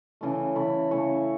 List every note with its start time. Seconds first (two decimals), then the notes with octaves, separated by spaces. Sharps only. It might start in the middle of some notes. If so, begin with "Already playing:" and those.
0.21 C#3 E3 A3
0.55 C#3 E3 A3 B5
0.91 C#3 E3 A3 C#5